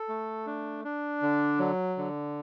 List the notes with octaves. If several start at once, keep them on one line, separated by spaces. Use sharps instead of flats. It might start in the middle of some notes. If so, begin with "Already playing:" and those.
Already playing: A4
A3
D4
D4
D3
F#3
D3